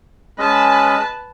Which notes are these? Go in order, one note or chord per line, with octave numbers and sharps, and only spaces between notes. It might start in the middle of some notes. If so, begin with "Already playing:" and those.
G#3 C#4 B4 D#5 A5